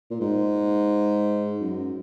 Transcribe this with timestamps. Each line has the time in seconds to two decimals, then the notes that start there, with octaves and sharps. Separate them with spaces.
0.11 A#2
0.21 G#2
1.60 F#2